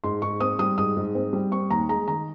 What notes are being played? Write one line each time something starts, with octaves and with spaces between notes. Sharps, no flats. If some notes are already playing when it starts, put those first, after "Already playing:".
G#2 C6
G#2 C#6
C4 D#6
G3 D#6
G#2 D#6
G#2
C4
G3
C4 C#6
D#2 A#5
G#3 A#5
D#3 A#5